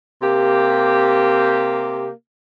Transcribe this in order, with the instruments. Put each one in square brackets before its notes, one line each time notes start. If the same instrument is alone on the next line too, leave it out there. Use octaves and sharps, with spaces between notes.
[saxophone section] C3 A#3 G4